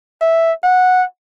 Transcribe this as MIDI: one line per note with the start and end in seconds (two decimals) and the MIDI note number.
0.21 0.52 76
0.64 1.05 78